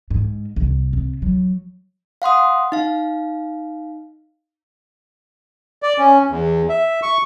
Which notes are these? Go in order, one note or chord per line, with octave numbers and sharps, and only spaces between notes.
G#2
C2
C3
F#3
F5 F#5 C6 D#6
D#4 F5
D5
C#4
E2
E5
C#6